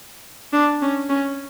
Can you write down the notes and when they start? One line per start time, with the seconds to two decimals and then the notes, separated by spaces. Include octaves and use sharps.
0.53 D4
0.82 C#4
1.09 C#4